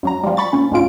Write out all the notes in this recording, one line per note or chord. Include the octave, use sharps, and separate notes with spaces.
F#2 F#3 A#5
F3 G3
B5 C#6 A6
A#2 C#4
D2 G#2 B2 C#4 F4 D7